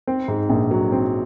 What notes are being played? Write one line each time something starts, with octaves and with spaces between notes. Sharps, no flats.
C4
G#2
A#1
F#3
C4